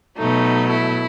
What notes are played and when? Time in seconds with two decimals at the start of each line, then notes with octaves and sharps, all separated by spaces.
0.17 B2 F#3 A3 D#4
0.71 E4